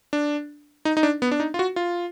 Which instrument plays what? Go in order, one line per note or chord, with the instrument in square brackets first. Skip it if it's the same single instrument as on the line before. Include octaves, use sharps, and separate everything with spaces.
[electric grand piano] D4
D#4
D#4
D4
B3
D4
D#4
F4
F#4
F4